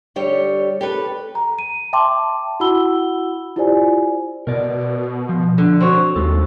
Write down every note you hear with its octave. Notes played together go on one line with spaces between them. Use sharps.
D3 G3 G4 C#5
G4 A4 B4
A#5
D#7
E5 G5 A5 C6 D6
E4 F#4 F#5 B5 E6 G7
E4 F4 G4 C5 D5 G#5
B2 A#4 D5
F3
D3
C4 F#4 C#5
D#2 G#3 A4